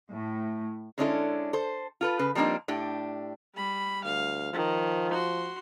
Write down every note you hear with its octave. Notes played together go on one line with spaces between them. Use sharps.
A2
D3 G#3 C#4 D4 E4 A4
A4 C5
F4 A4 B4
C#3 B4
F3 G3 A#3 C4 D4 D#4
A2 D4 G4
G3 B5
D2 F5
D#3 F3
F#4 C6